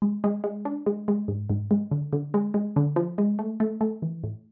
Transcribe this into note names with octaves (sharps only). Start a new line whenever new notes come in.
G#3
G#3
G#3
D4
G#3
G#3
G#2
G#2
G#3
D3
D3
G#3
G#3
D3
F3
G#3
A3
A3
A3
E3
A2